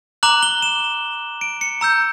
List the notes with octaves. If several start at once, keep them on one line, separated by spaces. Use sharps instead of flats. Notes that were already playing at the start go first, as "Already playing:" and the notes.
A#5 D6 F#6 F#7
G7
E7
D7
C#7
A#5 E6 G6